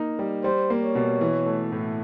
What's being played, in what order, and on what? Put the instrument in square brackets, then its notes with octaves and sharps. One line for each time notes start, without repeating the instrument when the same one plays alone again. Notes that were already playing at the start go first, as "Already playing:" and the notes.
Already playing: [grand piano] A#3 D#4
G3
[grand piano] G3 [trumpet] C5
[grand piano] A#3
[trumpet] C#5
[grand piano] B2
E3
A3
A2